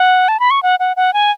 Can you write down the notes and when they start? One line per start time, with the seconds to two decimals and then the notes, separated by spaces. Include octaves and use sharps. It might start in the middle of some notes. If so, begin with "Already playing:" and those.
Already playing: F#5
0.28 A5
0.40 B5
0.50 C#6
0.63 F#5
0.80 F#5
0.97 F#5
1.13 G#5